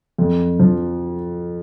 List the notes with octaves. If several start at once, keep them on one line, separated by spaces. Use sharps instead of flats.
F2
F3